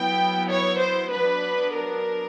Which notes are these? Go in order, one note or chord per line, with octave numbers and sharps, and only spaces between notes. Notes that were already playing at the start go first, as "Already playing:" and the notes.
Already playing: F#3 B3 E4 G5
C#5
C5
F#3 B3 D4 B4
A#4